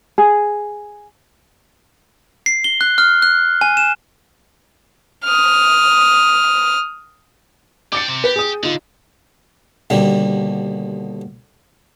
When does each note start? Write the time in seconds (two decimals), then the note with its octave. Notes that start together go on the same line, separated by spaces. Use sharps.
0.18 G#4
2.46 C7
2.64 G7
2.81 F#6
2.98 F6
3.22 F#6
3.61 G#5
3.77 E7
5.24 D#6 F6
7.93 D4 G5 D6 A6 C#7
8.08 C3 C4
8.24 G4 B4
8.36 G#4 D#6
8.63 D3 D#4 F4
9.90 D#2 B2 D3 G3